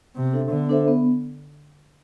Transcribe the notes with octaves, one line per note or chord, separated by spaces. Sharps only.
C3 B3
D4 A4 C5 E5
D3 B3
D4 A4 C5 E5
B3